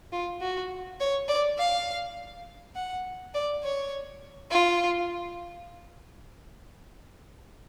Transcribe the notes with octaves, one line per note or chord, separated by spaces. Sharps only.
F4
F#4
C#5
D5
F5
F#5
D5
C#5
F4